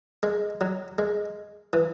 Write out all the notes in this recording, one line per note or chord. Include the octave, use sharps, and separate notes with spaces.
G#3
F#3
G#3
E3